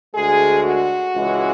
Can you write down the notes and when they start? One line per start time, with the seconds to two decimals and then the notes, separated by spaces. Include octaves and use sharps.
0.14 D2 D3 G#3 G#4
0.64 F#4
1.15 C#2 C#3 E3 G#3